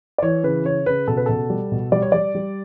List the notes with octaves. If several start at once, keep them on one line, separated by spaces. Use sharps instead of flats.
D5
E3 C#5
C#3 B4
C#3 C#5
C#3 B4
B2 A4
B4
B2 A4
G3
B2
G3 D5
C#5
G3 D5
G3